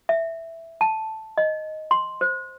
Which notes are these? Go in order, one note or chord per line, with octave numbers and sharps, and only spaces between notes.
E5
A5
D#5
C6
C5